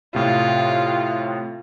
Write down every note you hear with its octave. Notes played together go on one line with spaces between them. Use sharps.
A2 C3 F4